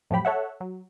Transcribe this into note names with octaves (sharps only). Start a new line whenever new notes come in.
F2 A2 F3 F#3 G4 B5
A4 C#5 E5 F#5
F#3